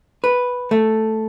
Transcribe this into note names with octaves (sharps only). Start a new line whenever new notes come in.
B4
A3